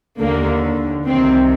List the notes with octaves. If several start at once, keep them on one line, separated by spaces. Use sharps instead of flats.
D#2 D3 A#3
C2 C3 D#3 C4